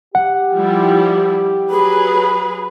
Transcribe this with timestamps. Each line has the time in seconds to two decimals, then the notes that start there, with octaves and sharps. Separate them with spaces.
0.15 G4 F#5
0.54 F3 G3 E4
1.70 F#3 G#4 B4 B5